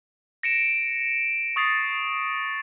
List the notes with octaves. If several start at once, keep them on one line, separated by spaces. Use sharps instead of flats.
A#6 C#7 D7 E7
C#6 D#6 A6 C7